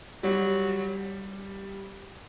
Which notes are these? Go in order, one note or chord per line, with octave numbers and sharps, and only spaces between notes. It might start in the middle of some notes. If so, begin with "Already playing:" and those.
F#3 G3